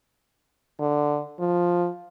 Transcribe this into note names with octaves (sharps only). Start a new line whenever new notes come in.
D3
F3